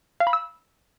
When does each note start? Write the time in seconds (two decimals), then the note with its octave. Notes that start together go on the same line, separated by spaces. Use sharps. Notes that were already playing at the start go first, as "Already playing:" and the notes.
0.20 F5
0.27 B5
0.33 E6